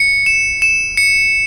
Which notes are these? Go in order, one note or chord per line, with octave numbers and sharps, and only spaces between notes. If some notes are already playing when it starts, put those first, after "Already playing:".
Already playing: C#7
E7
E7
C#7